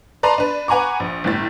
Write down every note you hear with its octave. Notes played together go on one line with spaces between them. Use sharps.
B4 D5 A5 A#5 C6
D4 B4
B4 F#5 G#5 A#5 C#6 D6
A#1
G1 A2 A6